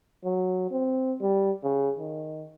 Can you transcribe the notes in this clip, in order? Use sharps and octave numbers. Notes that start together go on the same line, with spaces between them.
F#3
C4
G3
C#3
D#3